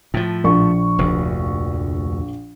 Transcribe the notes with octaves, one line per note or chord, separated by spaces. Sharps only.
A2 F3
A#1 C#6
F1 D2